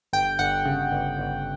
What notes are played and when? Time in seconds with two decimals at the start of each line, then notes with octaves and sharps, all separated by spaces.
0.13 G1 G5
0.39 G1 F#5
0.65 C#3
0.92 G1
1.19 G1